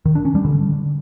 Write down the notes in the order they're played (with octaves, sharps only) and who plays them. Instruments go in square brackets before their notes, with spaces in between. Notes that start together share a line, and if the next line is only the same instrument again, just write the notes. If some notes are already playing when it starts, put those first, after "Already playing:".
[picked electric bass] D#3
D4
C#4
G3
D3